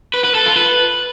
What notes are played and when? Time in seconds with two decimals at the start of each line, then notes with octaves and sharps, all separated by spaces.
0.14 B4
0.24 B4
0.35 A4
0.46 F4
0.56 B4